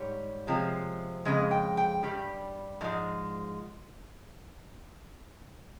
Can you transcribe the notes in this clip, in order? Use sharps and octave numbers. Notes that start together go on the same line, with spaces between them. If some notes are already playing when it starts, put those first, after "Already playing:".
Already playing: G#2 G3 C#5
C3 F3 G#3
F2 C#3 G#3 D#5
G5
G5
G2 G3
G#2 F3 G#3